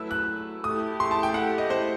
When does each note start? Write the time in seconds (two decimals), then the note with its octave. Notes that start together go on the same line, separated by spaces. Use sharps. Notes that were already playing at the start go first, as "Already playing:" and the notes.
Already playing: F#3 A3 E4 B4 E6
0.11 F#6
0.64 A3 E4 G4 D#6
1.00 C6
1.11 A5
1.23 G5
1.34 F#5
1.58 D#5
1.70 C5